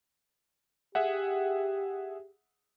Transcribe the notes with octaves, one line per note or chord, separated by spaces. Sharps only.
G4 G#4 E5 F#5